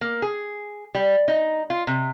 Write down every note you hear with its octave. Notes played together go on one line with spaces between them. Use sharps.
A#3
G#4
G3
D#4
F4
C3